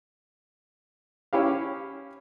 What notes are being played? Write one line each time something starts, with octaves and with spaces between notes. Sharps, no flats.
C#4 E4 G4 F5